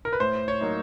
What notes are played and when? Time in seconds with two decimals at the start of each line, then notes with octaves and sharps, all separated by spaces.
0.05 A#4
0.13 B4
0.20 A2 C5
0.48 C#5
0.61 F#3 A#3 D#4